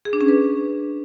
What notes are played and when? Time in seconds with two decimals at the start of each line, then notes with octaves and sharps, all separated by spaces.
0.05 G#4
0.13 D4
0.21 C#4
0.28 B4